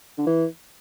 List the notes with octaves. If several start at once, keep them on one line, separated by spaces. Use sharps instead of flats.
D3
E3